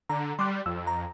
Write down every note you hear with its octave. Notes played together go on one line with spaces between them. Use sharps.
D3 A#5
G3 C6 D6 F#6
F2 E6
A#5